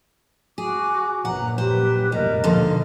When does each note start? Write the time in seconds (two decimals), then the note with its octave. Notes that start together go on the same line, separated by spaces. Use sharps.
0.58 F#4 G#4 G#5 D6
1.25 A#1 F#2 B4 F#5 A#5
1.58 G4 B4 C5
2.12 F1 A#1 G3 A#4 D#5
2.44 D#2 B2 D3 F3 F5